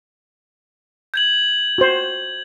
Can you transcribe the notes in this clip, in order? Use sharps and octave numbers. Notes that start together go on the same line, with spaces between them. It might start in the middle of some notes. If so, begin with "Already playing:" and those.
G6 G#6 F#7
F#4 C5